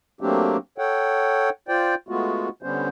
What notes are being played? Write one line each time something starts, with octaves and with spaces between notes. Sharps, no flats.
F#3 A3 A#3 C4 D4 G4
A4 C#5 F#5 G5
F4 C5 D5 G5
G#3 A3 B3 F4 F#4
D3 G3 B3 C#4 C5